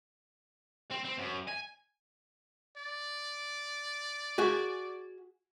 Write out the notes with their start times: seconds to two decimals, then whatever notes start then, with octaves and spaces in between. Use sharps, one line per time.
0.91 C4
1.04 C4
1.18 F#2
1.48 G#5
2.77 D5
4.38 F#4 G#4